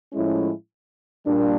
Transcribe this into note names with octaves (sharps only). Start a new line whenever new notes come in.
A2 F3 G#3 C#4 E4
A#2 G3 A#3 D4